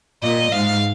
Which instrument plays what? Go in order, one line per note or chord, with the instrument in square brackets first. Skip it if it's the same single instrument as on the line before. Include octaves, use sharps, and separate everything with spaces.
[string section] A#2 [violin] D#5
[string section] G#2 [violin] F5